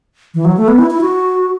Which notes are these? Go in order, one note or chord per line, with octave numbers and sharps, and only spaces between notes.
E3
F#3
A3
B3
E4
E4
F#4